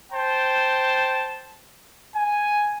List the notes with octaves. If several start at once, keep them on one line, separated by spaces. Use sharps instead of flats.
C5 G5 A5
G#5